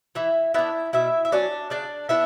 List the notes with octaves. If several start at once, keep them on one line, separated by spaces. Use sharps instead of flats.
E3 E4 E5
B3 D4 E4 E5
B2 E4 E5
E5
F#3 C#4 D4 D5
C#3 D4 D5
B3 D4 E4 E5